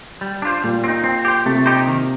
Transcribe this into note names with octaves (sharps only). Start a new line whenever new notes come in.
G3
D4 F4 C5
A#2 G3
C4
D#4
C4
G4 C5
C3 A3
D#4 G4 C5
D#3